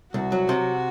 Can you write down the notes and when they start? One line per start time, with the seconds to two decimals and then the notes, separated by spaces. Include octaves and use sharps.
0.14 C2 F#4
0.32 F#3
0.49 C3